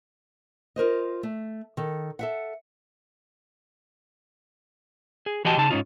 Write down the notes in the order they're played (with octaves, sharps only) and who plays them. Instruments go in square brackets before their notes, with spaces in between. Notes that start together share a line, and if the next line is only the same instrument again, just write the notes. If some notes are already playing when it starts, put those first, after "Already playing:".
[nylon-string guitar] F4 A#4 C5 D#5
A3
D#3 A4
A4 E5 F#5
[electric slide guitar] G#4
E3 F#4 G4 D#5 G5 A5
C#3 D#4 A5
G#2 C#4 D#4 F4